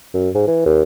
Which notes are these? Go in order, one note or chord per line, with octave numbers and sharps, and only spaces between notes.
F#2
G#2
E3
D#2